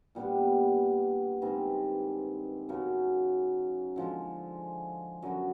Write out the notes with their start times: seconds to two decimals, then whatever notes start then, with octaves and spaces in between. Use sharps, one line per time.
0.15 A#2 G3 B3 D4
1.42 G2 D#3 G#3 C4
2.69 F#2 C#3 F#3
3.96 D3 F3 G#3
5.22 F#2 D3 F#3